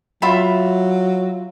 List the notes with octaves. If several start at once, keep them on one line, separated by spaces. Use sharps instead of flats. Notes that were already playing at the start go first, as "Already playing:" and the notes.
F#3 F4 E5 B5